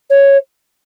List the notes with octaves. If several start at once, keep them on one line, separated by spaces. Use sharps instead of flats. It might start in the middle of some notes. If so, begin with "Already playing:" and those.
C#5